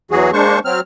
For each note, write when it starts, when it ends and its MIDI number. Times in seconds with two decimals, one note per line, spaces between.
0.11 0.31 40
0.11 0.31 52
0.11 0.31 54
0.11 0.31 66
0.11 0.31 68
0.33 0.59 56
0.33 0.59 58
0.33 0.59 62
0.33 0.59 72
0.33 0.59 85
0.65 0.80 54
0.65 0.80 60
0.65 0.80 89